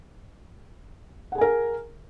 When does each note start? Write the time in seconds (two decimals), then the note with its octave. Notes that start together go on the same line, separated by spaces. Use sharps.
1.32 F#5
1.35 G#4
1.38 G#5
1.41 A#4